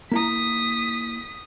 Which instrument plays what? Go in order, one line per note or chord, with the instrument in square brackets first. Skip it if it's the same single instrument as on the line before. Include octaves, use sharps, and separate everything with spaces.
[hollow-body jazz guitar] A#3 E4 A#5 [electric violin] D#6 B6